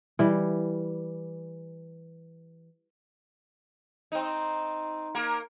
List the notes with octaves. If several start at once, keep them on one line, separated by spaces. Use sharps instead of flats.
E3 G3
C4 D#4
A#3 A#4